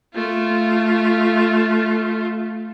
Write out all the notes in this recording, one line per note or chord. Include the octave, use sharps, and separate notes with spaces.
A3 F4